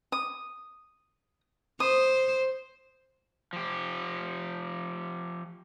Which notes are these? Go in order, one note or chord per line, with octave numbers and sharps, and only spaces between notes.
D#6
C5 D#6
F3 G4